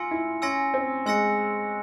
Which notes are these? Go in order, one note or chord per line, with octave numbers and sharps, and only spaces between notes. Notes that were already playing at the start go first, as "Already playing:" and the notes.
Already playing: F4 G#5 C6 E6 A#6 C#7
E4
C#4 G#5 C6 E6 A#6 C#7
C4
G#3 G#5 C6 E6 A#6 C#7